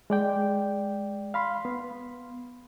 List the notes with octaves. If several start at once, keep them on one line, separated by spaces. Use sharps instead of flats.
G#3 D5 G5
F5 B5 C6
B3